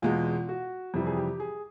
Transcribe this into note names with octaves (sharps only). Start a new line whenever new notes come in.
E2 B2 G#3 F4
F#4
F2 C3 E3 G3
G#4
G4
G#4